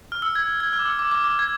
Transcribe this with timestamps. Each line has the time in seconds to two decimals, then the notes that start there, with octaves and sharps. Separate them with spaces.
0.12 F6
0.22 E6
0.35 G#6
0.60 G#6
0.73 F6
0.79 D6
0.86 E6
0.99 D6
1.11 D6
1.24 D6
1.39 G#6